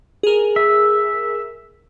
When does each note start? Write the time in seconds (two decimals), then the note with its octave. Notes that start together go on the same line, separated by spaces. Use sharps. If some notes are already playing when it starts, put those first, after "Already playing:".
0.23 G#4 A#4
0.56 E5